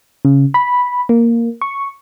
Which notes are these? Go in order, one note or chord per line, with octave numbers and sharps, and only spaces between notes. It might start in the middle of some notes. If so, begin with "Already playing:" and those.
C#3
B5
A#3
C#6